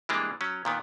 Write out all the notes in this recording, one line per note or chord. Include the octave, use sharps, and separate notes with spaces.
E3 G3 G#3 A#3 D4
F#3 C#4
A#2 D#3 B3